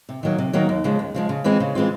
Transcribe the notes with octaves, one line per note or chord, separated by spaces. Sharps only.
C3
D#3 F#3 A#3
C3
D#3 F#3 A#3
D#2
C#3 F3 G#3
D#2
C#3 F3 G#3
C#3
E3 G#3 C4 F4
C#3
E3 G#3 C4 F4